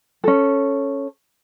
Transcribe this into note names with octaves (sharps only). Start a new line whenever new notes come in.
C#4 A4